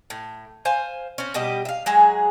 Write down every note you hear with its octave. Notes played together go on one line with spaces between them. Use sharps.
A2
C5 F5 G#5
C4 C#4
B2 G3 G4 D#5
E5 F5
F#3 G#3 G#4